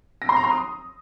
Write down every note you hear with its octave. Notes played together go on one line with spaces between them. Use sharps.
A#6
C6
A#5
C6
D#6